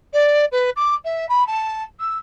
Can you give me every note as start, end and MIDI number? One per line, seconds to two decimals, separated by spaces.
0.13 0.45 74
0.51 0.70 71
0.76 0.94 86
1.04 1.26 76
1.29 1.46 83
1.46 1.83 81
1.99 2.17 88